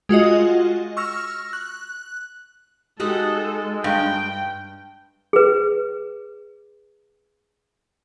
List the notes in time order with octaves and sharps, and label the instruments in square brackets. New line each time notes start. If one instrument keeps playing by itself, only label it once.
[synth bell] G#3 F4 F#4 D#5
C#6 E6 F6 A#6
F#6
[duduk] G#3 [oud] D#4 F#4 G4 [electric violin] A4
[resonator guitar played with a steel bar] G2 [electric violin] G5
[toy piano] G#4 B4